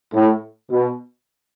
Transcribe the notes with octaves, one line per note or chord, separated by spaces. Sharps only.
A2
B2